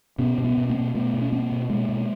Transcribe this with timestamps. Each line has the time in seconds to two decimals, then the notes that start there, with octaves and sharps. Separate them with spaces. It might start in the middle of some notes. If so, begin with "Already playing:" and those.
0.19 B2 B3 C#4
0.38 B2
0.44 B3 C#4
0.57 B2
0.69 A#3 C4
0.76 B2
0.94 B2 A3 B3
1.14 B2
1.21 C#4
1.32 B2 A#3 C4
1.52 B2
1.69 B2 G#3 A#3
1.89 B2